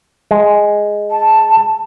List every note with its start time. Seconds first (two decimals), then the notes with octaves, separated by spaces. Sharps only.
0.31 G#3
1.11 A5